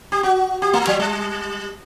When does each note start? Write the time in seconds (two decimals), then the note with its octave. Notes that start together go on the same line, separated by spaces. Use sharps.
0.12 G4
0.23 F#4
0.62 G4
0.73 A3
0.87 F#3
1.00 G3